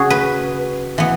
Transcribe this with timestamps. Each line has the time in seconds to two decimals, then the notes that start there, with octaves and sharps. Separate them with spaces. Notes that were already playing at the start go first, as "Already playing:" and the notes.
Already playing: C#3 F#4 G#4
0.10 B4
0.98 E3 B3